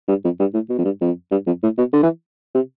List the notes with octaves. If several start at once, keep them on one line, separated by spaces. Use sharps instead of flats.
G2
F2
G2
A2
B2
F2
G2
F2
G2
F2
A2
B2
D3
E3
C3